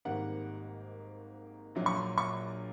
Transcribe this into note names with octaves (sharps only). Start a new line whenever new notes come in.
G#1 G#2 D#3 G3 A#3 F#5
A#1 A#2 F#3
C#6
C6
C#6